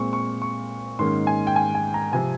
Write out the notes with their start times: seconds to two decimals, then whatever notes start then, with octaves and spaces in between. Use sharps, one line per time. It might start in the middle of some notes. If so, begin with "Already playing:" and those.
Already playing: A#2 G#3 C4 C#6
0.13 C#6
0.42 C#6
0.99 G#2 D#3 A#3 C#4 C6
1.27 G#5
1.47 G5
1.56 G#5
1.75 G#5
1.94 A#5
2.13 C3 F3 C4 G#5